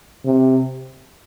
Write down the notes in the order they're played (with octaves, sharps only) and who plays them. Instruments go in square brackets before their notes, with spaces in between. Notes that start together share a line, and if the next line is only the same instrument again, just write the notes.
[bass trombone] C3